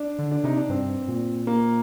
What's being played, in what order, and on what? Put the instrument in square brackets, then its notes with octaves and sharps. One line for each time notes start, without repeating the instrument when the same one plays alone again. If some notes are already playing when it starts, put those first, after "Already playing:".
Already playing: [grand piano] D4
[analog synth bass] D3
[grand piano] D4
[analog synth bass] C3 [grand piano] D#4
[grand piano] D4
[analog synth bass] G2 [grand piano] C4
[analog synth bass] A#2
[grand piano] A#3